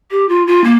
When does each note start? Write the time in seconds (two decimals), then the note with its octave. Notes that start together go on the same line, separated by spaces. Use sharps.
0.11 G4
0.29 F4
0.47 F4
0.64 A#3